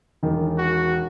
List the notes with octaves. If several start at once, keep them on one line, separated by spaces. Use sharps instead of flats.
E1 D#3
F#4